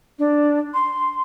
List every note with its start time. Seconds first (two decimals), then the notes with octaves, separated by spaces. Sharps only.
0.19 D4
0.74 C6